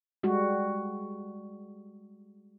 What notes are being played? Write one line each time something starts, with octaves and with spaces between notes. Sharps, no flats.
G3 G#3 F#4